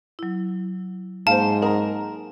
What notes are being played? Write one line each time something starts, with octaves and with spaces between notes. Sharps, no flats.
F#3 E4
G#2 A#3 C5 F5 A5
D#4 A#4 F#5 A#5